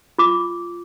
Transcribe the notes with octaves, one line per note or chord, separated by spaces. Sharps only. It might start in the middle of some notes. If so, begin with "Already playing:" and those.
F4 D6